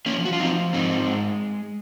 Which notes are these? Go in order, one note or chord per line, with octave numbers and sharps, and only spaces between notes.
F3 A#3 C#4
F#4
F4
F3 C4 D#4
G#2 C4 D#4
G#3